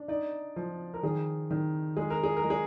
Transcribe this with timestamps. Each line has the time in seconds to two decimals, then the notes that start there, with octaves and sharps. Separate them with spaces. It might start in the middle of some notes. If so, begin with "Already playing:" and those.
Already playing: D4
0.08 D#4 D5
0.56 F3
0.94 A#4
1.03 D#3 G#4
1.51 D#3
1.97 G#3 G#4
2.10 A#4
2.23 G#4
2.37 A#4
2.44 G#3
2.50 G#4